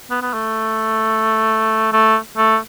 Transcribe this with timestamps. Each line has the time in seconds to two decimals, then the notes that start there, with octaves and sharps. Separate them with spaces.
0.11 B3
0.22 B3
0.34 A3
1.93 A3
2.38 A3